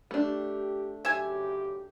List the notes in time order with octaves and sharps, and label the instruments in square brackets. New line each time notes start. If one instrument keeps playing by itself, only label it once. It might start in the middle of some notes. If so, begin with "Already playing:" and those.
[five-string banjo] A3 D4 [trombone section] G4
[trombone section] F#2 C#3 G4 [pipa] E5 G#5